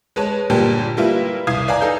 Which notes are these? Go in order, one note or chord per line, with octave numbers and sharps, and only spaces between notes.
G#3 B4 C#5 A5
G1 A#2 G3 A#3 G5 A5
G3 A#3 E4 F4 B4
C2 F5 D#6 G#6 C7
B4 D5 F5 G#5 A#5
D#4 A4 F5 G6